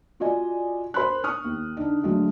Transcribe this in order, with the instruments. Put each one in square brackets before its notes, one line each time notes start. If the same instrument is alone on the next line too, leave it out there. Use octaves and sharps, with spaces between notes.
[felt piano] F4 F#4 D5 D#5 G#5
A#4 C5 B5 C6 F#6
C#6 D#6 F6
D#2
D3 D4 D#4
D2 D3 F#3 G#3 A3 D4